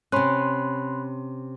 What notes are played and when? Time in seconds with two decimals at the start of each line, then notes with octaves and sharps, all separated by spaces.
0.12 C3 C#4 B5 C6 F#6